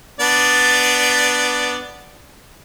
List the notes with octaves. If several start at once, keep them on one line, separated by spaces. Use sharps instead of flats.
B3 D4 D5